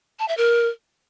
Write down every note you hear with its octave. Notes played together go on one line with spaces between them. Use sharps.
A5
E5
A#4